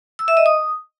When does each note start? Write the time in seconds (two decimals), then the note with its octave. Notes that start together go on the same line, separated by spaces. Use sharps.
0.19 E6
0.28 E5
0.37 D#5
0.46 D#6